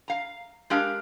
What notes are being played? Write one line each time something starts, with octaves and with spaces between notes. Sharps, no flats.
F5 A#5
G#3 D4 G4 A#4 F5